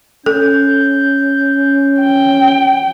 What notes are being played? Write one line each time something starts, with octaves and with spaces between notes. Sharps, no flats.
C#4 A4 G6
G5